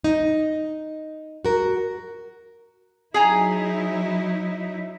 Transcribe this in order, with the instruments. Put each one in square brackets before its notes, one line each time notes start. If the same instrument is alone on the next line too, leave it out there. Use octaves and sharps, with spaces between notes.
[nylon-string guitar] D#4
F#4 A#4
[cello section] F#3 D#4 E4 [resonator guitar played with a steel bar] G#4 G#5 A#5